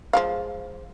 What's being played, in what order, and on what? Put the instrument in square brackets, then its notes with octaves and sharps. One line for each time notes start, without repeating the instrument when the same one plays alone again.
[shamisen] F3 G#3 F5